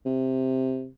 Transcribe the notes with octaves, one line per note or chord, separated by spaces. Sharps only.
C3